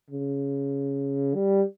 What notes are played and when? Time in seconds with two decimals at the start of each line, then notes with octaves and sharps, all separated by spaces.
0.11 C#3
1.35 G3